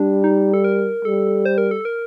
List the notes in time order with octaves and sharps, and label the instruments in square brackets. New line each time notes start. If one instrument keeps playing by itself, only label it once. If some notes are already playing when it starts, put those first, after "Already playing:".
Already playing: [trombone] G3 [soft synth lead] D4
[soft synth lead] D#4
A4
A#4
[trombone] G3 [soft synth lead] A4
[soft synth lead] C5
A#4
A4
A#4